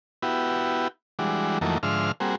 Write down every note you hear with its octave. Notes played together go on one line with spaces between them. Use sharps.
B3 E4 F#4 G4
E3 G3 G#3 D4 F#4
F2 D#3 E3 F#3 A3 A#3
G#2 D3 F3 E5 C6 F6
G3 A#3 C4 F#4 G#4